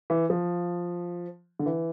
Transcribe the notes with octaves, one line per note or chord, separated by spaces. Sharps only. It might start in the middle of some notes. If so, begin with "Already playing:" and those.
E3
F3
D3
E3